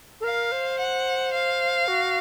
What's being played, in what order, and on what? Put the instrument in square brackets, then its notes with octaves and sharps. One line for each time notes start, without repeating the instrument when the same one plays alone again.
[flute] A4
[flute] A#4 [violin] F5
[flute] C5
[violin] F#5
F5
[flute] F#4